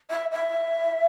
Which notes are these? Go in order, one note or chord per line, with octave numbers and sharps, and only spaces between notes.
E5
E5